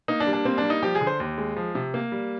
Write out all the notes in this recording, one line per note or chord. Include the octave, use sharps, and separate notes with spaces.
A#3 D#4
D4
G3
D4
A#3 C4
D4
G3
D#4
F3 G4
G#4
D3
C5
D#2
G#3
F3
C3
A#3
G3